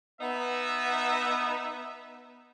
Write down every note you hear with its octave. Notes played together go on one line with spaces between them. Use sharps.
B3 D#4 E5